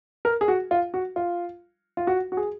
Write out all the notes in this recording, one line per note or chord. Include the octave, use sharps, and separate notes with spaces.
A#4
G#4
F#4
F4
F#4
F4
F4
F#4
F#4
G#4